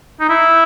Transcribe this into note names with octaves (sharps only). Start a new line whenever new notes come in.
D#4
E4